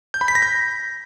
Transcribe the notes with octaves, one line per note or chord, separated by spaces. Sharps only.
G6
B5
B6
A#6
G6